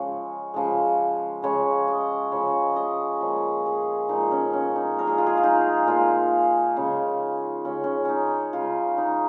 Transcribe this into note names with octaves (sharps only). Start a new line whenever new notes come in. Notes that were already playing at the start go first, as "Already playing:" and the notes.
Already playing: C#3 F3 G#3 C#5
C#3 F3 G#3
C#3 F3 G#3 C#5
D#5
C#3 F3 G#3 C#5
D#5
A#2 F3 G#3 C#5
G#4
A#2 F3 G#3 D#4
C#4
C#4
D#4
A#2 F3 G#3 A#4
G#4
F4
G#4
F4
D#4
A#2 F3 G#3 F4
C#3 G#3
C#3 G#3 C#4
C#4
C#4 D#4
C#3 G#3 F4
D#4